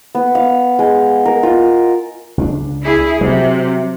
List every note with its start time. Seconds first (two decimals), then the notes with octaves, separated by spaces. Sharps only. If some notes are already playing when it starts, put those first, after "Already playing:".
0.15 B3
0.35 F5
0.79 G#3
1.26 A#4
1.43 F4
2.38 C#2 A3 D4
2.84 E4 G#4
3.21 C3 F#3